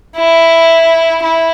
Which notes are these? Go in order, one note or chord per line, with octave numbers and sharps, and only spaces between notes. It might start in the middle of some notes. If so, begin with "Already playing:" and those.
E4
E4